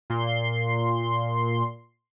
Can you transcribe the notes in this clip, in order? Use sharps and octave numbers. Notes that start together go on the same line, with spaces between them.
A#2 C6